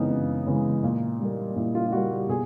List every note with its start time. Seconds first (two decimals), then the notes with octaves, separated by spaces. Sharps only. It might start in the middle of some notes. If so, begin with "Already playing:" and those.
Already playing: F#2 C#3 E3 G#3 B3 C4 D#4
0.10 F#2
0.46 C#3 E3 G#3 B3
0.83 A#2
1.20 G3 A#3
1.56 A#2 E4
1.75 F4
1.87 F4
1.92 G3 A#3 F#4
2.11 G4
2.29 B2 G#4